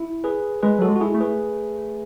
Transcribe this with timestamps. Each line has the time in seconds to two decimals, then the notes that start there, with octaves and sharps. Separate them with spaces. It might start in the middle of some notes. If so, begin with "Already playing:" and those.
Already playing: E4
0.24 G#4 B4
0.63 G#3 G#4 B4
0.79 F#3 F#4 A4
0.88 G#3
0.96 F#4
1.01 E4 G#4
1.14 A3
1.21 G#4 B4